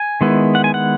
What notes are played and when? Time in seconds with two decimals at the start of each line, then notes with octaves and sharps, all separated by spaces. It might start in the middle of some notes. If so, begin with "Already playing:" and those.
Already playing: G#5
0.21 D#3 G#3 B3 E4
0.55 F#5
0.64 G#5
0.74 F#5